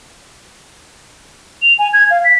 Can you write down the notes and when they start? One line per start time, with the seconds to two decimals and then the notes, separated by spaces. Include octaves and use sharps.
1.62 F7
1.79 G#5
1.93 G#6
2.11 F5
2.25 B6